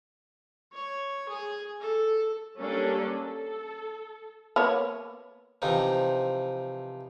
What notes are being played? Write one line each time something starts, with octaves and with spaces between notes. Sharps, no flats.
C#5
G#4
A4
G3 A#3 C#4 D4 A4
A4
A#3 B3 C#5
C3 E3 F3 D#4